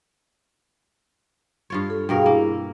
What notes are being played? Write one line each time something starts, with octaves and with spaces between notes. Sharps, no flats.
G2 F4 C#5
A4
G2 B2 G#4 A#4 F5 G5
A#3 E4